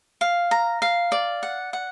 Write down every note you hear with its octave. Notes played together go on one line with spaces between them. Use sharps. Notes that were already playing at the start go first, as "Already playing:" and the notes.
F5
A#5
F5
D5
F#5
F#5